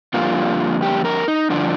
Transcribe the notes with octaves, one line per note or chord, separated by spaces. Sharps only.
F2 D3 G3 A#3 F4
G4
A#4
D#4
G2 D3 F3 D4